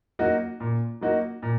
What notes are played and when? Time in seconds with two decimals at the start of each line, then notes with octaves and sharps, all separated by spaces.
0.19 F#3 A#3 D#4 F#4
0.60 A#2
1.01 F#3 A#3 D#4 F#4
1.43 A#2